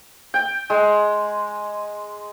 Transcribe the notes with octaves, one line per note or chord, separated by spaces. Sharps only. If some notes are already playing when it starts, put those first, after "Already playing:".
G5
G#3